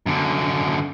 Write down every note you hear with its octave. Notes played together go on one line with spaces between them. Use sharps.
F#2 D3